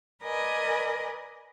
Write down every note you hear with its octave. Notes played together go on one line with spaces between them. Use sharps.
A#4 B4 D5 D#5 G#5